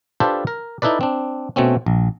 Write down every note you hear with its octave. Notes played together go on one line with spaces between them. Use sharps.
D4 F4 G4 A4 B4 C5
A#4
D#4 E4 A4 B4 D5
C4 D4
B2 A3 C4 C#4
A#1